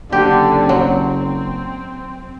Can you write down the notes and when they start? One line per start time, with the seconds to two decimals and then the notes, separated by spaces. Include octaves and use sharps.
0.12 F#1 D3 G4
0.69 F#3 C4